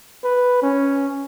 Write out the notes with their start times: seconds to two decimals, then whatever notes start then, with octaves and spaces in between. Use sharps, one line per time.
0.24 B4
0.62 C#4